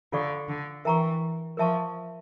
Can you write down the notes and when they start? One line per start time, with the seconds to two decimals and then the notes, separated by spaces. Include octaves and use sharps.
0.12 D3 F4 A4 D5 F5 C#6
0.49 D3
0.85 E3 A#4 E5 G5 A#5 C#6
1.57 F3 A#4 E5 A5 C#6